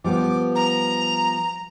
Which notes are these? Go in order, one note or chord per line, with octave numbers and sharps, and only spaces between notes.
F3 G3 B3 D6
A#5